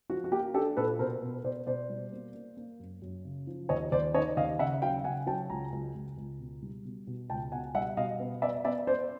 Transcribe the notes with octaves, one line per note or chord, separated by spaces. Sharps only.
F3 F#4
F#4
A#3 G4
D4 G4 A4
A#2 A4 B4
B2 A#4 C5
B3
B2 C5 D5
B2 C5 D5
G3
A#3
A#3
A#3
F#2
F#2
C#3
F3
D#2 C#5 D#5
D#2 C5 D5
D#3 C#5 D#5
D#2 D#5 F5
C#3 E5 F#5
F#3 F5 G5
C#3 F#5 G#5
F#3 G5 A5
C#2 G#5 A#5
C#2
C#2
C#2
B2
G3
B2
B2
C#2 G5 A5
B2 F#5 G#5
G3 E5 F#5
B2 D#5 F5
B3
B3 D5 E5
B3 D5 E5
B3 C5 D5